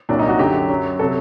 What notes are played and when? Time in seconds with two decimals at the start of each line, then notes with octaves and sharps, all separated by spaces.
0.09 C2 A#2 F#3 D4
0.19 D#4
0.29 F#4
0.39 F#2 D3 F#3 G4
0.69 F#2 F#3
0.99 C3 F#3 A4